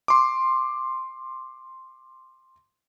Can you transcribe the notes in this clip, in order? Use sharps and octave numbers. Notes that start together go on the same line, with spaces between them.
C6 D6